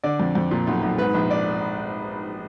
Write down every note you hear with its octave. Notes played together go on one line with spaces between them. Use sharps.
D3 D5
F2
F2
A#2
B1
B1
G#2 B4
A#1
D5